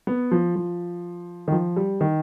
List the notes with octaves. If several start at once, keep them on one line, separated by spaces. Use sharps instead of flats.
B3
F3
F3
D#3
F3
G3
D#3